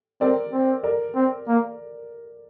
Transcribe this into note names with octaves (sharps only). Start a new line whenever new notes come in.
C4 A#4 D5
C4
A#4 D5
C4
A#3